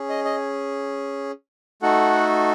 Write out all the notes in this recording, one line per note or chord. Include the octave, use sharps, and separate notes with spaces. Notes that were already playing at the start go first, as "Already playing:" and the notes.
Already playing: C#4 G#4
D#5
D#5
A3 D#4 F#4 A4 F#5